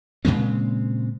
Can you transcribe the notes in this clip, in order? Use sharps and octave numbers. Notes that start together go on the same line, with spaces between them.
A#2 C#3 G#3 C4